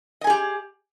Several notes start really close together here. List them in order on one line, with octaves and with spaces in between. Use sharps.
D#5 G#5 G#4 G4